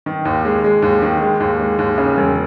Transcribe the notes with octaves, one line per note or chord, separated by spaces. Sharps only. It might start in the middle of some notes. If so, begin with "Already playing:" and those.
D#3
D#2
G#3
G#3
D#2
D#3
G#3
D#2
G#3
D#2
C#3
E1